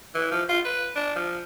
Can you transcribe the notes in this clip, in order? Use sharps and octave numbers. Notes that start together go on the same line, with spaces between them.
E3
F3
F4
B4
D4
F3